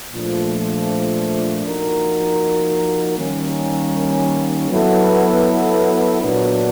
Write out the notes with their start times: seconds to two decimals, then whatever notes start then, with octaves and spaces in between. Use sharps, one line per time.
0.13 A#2 F3 A3 D4
1.66 F3 A#3 D#4 F#4 A#4
3.18 D#3 G3 A#3 C#4
4.70 F#3 B3 E4 A4
6.22 A#2 F#3 B3 D4